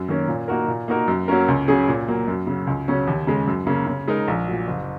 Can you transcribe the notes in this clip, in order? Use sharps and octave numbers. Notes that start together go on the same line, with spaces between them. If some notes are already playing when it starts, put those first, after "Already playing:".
Already playing: F#2
D#3 A#3 C#4 A#4
A#2
A#3 D#4 F#4 A#4
A#2
A#3 D#4 F#4 A#4
F#2
F#3 A#3 C#4 A#4
C#2
C#3 F#3 C#4 G#4
A#2
F#3 A#3
F#2
C#3 F#3
C#2
C#3 F#3 C#4
D#2
C#3 G#3
F#2
C#3 A#3
C#3
G#3 D#4 A#4
A#1
A#2 F#3
F#1